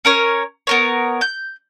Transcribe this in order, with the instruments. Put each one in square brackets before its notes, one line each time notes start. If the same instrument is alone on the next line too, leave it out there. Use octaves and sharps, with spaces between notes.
[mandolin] C#4 A#4 C#5
B3 A#4 C#5
G6